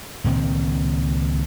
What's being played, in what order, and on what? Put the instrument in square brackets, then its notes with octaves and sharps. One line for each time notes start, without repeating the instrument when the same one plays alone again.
[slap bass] C#2 A#2 D#3 C4